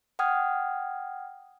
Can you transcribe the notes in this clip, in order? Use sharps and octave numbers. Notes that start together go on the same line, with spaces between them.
F#5 G5 D#6 F6 G#6